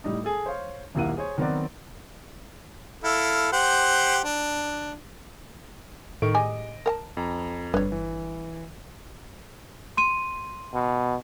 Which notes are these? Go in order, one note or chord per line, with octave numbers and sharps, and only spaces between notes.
A2 G3 D#4
G#4 A4
C5 C#5 F5
D#1 B1 A#3 E4 F#5 D#7
G#4 C5 C#5
D#3 F#3 B3 C4 F#4 D5
E4 A4 F5
G4 C5 F#5
D4
A2 D#3 C#6 D7
G3 G#4 D#5 G#5
A#4 G5 A5
F2 A#5
G1 B4 C#5
E3
C6 D#7
B2